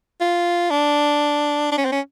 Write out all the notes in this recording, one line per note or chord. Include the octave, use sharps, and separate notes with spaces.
F4
D4
D4
C#4
C4
C#4